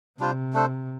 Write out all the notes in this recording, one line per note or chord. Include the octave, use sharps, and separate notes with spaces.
C3 G3 D4 F4 C5
A3 D4 A4 C5